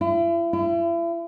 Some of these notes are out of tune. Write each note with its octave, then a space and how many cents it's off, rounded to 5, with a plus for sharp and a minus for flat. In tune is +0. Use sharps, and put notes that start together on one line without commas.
E4 +40
E4 +40